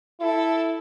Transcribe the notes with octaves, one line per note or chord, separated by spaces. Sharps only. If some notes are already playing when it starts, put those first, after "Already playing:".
E4 A4